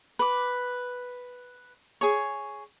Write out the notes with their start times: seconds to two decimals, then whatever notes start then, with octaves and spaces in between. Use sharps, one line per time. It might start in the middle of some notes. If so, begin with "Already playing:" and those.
0.19 B4 D6
2.01 G#4 C#5